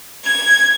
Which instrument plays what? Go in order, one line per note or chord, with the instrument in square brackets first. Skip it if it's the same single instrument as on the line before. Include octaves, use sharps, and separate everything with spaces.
[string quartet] G#6